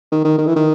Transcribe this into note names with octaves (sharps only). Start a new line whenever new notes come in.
D#3
D#3
D#3
E3
D#3